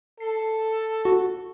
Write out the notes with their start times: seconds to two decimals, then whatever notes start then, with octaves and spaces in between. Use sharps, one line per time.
0.20 A4 C7
1.05 F#4